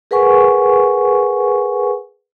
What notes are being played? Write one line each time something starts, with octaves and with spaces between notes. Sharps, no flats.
G#4 A#4 B4 F#5 G#5 C#6